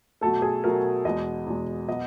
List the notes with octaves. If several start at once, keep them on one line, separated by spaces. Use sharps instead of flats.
B2 F#3 A3 A4
G#4
B2 F#3 A3 A#4
E2 B2 G#3 D#5
E2 B2 G#3
B2 F#3 B3 D#5